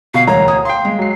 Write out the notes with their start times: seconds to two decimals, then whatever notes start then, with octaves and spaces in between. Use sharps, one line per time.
0.14 B2 F5
0.27 E1 D2 C#5 A#5
0.48 D#6
0.65 F5 G5 C6
0.85 G#3
0.99 F#3 C7